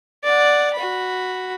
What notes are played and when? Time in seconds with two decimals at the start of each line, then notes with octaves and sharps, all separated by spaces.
0.24 D5 F#5
0.75 F#4 B5